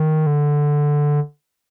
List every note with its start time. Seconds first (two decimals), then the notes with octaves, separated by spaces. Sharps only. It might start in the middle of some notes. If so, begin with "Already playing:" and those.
Already playing: D#3
0.27 D3